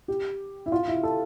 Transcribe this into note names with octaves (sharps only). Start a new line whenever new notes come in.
G4
E4
F4
E4
A4